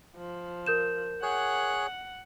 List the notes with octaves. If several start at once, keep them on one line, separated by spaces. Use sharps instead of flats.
F3
A#4 G6 E7
G#4 C#5 F#5 F#6